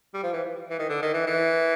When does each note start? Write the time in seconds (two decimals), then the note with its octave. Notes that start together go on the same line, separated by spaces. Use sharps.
0.14 G3
0.23 F3
0.33 E3
0.70 E3
0.79 D#3
0.89 D3
1.02 D#3
1.14 E3
1.27 E3